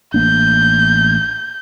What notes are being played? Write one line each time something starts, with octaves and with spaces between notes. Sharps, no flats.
A1 A#3 D4 G6